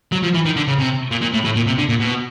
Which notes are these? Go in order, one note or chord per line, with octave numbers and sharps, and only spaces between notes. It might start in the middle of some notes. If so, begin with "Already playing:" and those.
F#3
F3
E3
D#3
D3
C#3
C3
A#2
A#2
A2
A2
A#2
C3
D3
A#2
B2